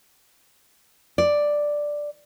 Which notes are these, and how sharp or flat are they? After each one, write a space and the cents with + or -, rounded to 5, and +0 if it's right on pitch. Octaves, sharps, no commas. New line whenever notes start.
D5 +5